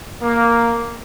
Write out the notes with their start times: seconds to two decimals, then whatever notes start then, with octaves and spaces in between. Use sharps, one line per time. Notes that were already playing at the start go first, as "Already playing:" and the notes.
0.21 A#3